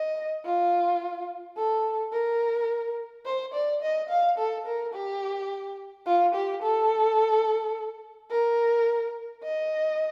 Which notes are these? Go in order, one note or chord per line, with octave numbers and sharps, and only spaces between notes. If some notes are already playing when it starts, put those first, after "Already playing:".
Already playing: D#5
F4
A4
A#4
C5
D5
D#5
F5
A4
A#4
G4
F4
G4
A4
A#4
D#5